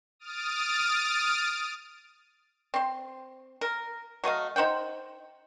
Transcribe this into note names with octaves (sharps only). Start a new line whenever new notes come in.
D#6 F6 A6 D7
C4 C6
A#4
F#3 A3 D#5 F5
D#4 C5 F#5 G5